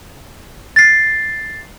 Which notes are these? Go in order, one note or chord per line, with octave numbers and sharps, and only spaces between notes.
A6 C7